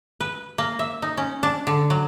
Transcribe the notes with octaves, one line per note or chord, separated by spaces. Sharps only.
B4
A#3
E5
D#4
C#4
D4
D3
F#3